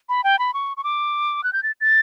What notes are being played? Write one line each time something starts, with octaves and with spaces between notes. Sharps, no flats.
B5
G5
B5
C#6
C#6
D6
F#6
G6
A6
A6